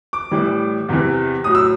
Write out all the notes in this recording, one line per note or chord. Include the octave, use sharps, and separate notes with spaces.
D6
A2 E3 G3
E2 C3 E3
A2 F#3 D#6
E6